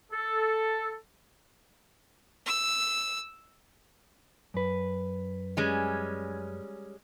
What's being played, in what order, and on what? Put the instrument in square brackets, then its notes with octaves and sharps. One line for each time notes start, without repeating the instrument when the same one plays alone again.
[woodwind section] A4
[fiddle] E6
[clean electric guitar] F#2 B4
[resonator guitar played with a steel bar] G3 G#3 C#4